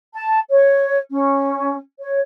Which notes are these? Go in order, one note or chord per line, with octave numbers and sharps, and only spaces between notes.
A5
C#5
C#4
C#5